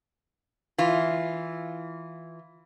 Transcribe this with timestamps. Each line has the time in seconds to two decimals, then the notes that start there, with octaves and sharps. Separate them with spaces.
0.78 E3 F4